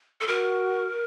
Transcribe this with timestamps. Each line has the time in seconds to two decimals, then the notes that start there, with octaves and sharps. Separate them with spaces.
0.21 A4
0.27 F#4 A#4